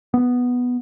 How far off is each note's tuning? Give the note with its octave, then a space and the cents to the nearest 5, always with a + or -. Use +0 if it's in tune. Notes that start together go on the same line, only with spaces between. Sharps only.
B3 +0